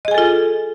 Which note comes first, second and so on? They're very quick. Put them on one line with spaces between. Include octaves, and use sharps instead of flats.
D#5 G#4 G#5 A4 F4